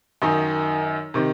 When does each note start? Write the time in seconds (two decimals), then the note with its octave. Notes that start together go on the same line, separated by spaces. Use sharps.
0.22 F#2 D#3 D#4
1.14 C3 D#3